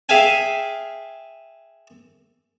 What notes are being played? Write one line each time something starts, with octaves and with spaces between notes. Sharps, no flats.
G#4 E5 F5 G5 G#5